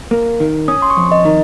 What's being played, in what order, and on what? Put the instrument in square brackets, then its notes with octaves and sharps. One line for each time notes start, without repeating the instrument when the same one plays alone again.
[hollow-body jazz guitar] A#3
D#3
[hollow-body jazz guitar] C#4 [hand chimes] D#6
[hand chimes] C6
C#6
[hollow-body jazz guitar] F2
[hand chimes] D#5
[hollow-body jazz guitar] D#3